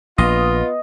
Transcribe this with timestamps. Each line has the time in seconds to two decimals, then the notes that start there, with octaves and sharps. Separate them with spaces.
0.18 A#1 B3 F4 D#5